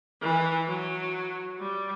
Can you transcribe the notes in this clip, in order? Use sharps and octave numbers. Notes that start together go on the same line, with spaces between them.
E3
F#3
G3